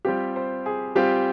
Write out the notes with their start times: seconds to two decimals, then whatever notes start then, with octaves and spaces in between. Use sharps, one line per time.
0.05 G3 C4 F4 G4
0.36 C5
0.66 G#4
0.95 G3 C4 F4 G4